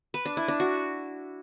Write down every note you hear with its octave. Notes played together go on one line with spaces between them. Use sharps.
B4
D4
E4
D4
F#4